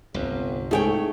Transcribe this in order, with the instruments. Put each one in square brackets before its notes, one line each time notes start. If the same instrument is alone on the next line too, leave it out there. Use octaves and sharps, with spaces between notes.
[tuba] G1 [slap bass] C2 G2
[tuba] G#2 [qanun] A3 C#5 G5 [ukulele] G#4 G#5